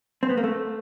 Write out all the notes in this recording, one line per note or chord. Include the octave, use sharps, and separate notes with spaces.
C4
B3
A#3
A3